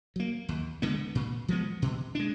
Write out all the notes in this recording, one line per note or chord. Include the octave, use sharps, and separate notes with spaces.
F#3 A#3
D#2
D3 G#3 B3
A#2
F3 G#3 B3
B2
G#3 D4